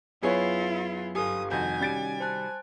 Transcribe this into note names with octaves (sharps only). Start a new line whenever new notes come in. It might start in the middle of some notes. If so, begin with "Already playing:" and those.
F#2 B3 E4 F4 G#4 B4 C#5
G1 G4 A4 F5 G#5 D#6
C2 F2 D#3 F#4 G#5 G6
G3 C#4 A6 D7
C5 A5 F#6